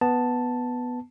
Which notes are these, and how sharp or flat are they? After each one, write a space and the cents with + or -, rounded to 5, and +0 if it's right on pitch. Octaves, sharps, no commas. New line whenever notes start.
B3 +0 A5 +0